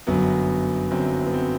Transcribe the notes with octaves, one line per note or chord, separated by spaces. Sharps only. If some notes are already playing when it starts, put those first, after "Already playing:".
G1 F#2 F#3 B3
G1 F#2 F#3 C4
B3
C4